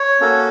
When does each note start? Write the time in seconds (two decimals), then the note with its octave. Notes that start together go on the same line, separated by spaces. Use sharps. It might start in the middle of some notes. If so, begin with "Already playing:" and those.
Already playing: C#5
0.21 A#3 C#4 F#4 A4